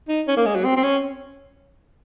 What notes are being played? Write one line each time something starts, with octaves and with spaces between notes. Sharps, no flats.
D#4
C#4
A#3
G#3
F#3
C4
C4
C#4